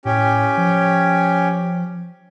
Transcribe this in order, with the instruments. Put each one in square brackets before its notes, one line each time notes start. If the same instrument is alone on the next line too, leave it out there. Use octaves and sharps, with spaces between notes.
[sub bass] A2 [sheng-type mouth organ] C#4 G4
[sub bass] F3